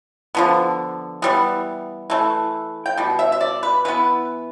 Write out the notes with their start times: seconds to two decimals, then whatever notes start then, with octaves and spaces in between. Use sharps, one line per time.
0.35 D3 F3 B3
1.22 E3 G3 B3
2.10 E3 A3
2.86 G5
2.98 B2 G3
3.19 E5
3.32 E5
3.41 D5
3.63 B4
3.85 E3 B3 B4